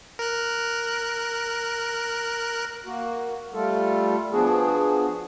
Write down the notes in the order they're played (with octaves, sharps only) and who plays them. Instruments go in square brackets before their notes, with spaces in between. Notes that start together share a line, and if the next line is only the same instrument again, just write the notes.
[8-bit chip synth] A#4 F#6
[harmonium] A#3 F#4
G3 A3 F4 A4
F3 B3 D4 F#4 G#4